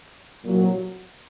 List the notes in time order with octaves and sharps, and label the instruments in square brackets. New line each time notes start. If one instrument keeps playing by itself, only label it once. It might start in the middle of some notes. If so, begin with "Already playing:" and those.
[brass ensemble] C2 A#2 F#3